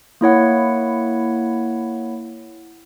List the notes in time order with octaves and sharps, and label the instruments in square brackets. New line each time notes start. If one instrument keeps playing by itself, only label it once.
[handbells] A#3 E4 C#5 F#5